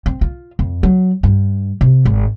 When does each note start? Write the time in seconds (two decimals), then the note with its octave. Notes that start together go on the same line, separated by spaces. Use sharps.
0.06 C4
0.21 F4
0.59 F2
0.83 F#3
1.23 G2
1.81 C3
2.05 G#1